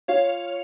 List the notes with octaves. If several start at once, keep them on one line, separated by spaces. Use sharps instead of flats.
F4 C#5 F5